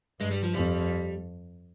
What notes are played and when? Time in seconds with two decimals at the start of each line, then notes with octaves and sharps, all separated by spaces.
0.20 G2 G#3
0.31 G3
0.43 F3
0.53 F2 G3